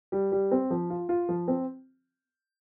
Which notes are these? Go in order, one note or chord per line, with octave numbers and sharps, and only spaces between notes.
G3
G3
C4
F3
F4
F4
F3
C4